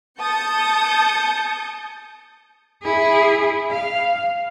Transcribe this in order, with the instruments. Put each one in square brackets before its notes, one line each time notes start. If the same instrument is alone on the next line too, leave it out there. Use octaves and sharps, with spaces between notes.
[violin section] A5 D#6 G6 C#7
[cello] E4 G#4
F5